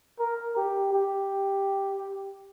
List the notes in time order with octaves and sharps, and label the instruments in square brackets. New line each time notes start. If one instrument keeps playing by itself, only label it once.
[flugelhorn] A#4
G4
G4